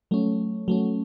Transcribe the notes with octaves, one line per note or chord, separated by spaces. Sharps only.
F#3 A3 C#4
F#3 A3 C#4